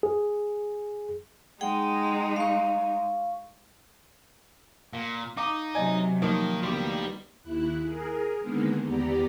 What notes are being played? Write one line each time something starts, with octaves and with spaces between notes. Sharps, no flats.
G#4
G#3 D#4 G#4 F#5 G5
F5 C#6
A#2 F5
D#4 F5 A#5 D6
C3 F#3 D5 D#5 G#5
D#3 F3 A#3 D#4
D2 D#3 G3 B3 F#4 D6
D#2 E4 F#6
G#4 A#4
D3 D#3 G#3 A#3 B3
E2 B3 G4 D5 A#5